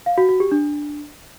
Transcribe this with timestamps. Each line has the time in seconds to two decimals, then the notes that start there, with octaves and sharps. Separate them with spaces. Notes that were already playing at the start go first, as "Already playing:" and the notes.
0.06 F5
0.18 F#4
0.29 F#4
0.40 G4
0.52 D4